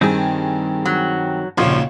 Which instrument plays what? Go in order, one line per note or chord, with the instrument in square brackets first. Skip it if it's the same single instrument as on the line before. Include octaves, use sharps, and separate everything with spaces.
[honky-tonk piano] G2 G#4 [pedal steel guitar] D#3 C4
[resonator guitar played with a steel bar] F#3
[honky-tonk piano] G#1 C#6 G#6 [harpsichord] D#2 A#2 C#3 [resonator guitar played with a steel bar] F3